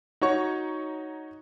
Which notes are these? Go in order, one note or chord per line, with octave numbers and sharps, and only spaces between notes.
D#4 F#4 C#5 C#6